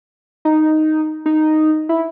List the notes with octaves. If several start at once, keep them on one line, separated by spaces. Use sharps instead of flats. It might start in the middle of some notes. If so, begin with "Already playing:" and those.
D#4
D#4
E4